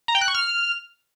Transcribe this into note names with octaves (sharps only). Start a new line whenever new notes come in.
A#5
G5
F#6
C#6
F6